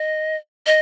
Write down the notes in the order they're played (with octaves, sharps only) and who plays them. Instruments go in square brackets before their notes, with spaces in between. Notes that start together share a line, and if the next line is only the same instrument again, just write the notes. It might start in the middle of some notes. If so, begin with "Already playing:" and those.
Already playing: [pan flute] D#5
D#5